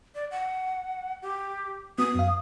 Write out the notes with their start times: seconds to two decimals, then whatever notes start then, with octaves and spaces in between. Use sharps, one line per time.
0.15 D5
0.31 F#5
1.22 G4
1.98 B3 F#4 D#6
2.15 F#2 F5